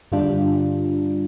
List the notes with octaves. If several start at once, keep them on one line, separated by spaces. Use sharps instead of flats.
G2 D3 G3 D4 F4